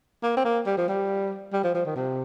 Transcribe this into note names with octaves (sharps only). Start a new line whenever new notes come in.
A#3
C4
A#3
G3
F3
G3
G3
F3
F3
D#3
C3